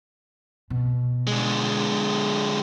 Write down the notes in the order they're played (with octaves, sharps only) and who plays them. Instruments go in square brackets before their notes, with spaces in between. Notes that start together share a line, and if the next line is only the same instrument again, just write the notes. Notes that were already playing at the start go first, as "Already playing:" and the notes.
[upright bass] B2
[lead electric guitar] D3 G#3